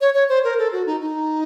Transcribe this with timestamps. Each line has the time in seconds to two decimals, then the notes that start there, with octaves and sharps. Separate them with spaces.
0.01 C#5
0.14 C#5
0.29 C5
0.44 A#4
0.58 A4
0.73 F#4
0.86 D#4
1.01 D#4